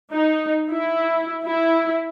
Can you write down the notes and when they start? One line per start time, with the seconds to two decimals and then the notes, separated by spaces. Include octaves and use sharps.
0.13 D#4
0.71 E4
1.46 E4